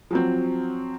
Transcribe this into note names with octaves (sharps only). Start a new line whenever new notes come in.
F3 F#3 C4